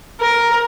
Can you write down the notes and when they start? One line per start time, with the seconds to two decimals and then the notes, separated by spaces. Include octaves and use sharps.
0.20 A#4